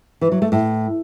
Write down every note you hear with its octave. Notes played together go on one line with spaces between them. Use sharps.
E3
F#3
A3
A2